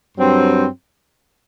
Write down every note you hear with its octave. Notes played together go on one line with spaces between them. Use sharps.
G2 F#3 C4